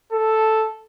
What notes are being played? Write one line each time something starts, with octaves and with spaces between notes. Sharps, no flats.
A4